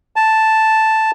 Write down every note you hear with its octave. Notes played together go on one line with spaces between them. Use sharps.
A5